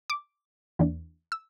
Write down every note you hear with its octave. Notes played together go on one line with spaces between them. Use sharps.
D6
E2 E3 A#3 D4
E6